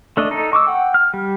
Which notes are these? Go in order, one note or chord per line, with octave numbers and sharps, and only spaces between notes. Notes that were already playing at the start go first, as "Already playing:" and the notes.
A3 D4 D#5
D#4 A4
C#6 D6 E6
F#5 G5
F6
G3